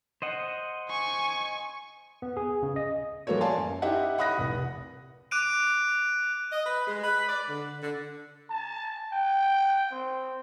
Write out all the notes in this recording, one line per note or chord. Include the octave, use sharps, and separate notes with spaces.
C5 D#5 F#5
G#5 C#6
B3
G#4
C#3
D#5
F3 G3 A#3 F#4 A4 C#5
D5 F5 G#5 A5 C6
F#2
D#4 E4 G4 D#5 E5 F#5
F#5 B5 D#6 F#6 A#6
F1 C2
D6 F#6 D7 D#7
D#5
B4
G#3
B4
D5
D3
D3
A5
G5
C4